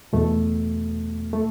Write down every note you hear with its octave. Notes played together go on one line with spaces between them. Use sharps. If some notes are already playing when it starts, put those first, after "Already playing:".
E2 B2 A3
A3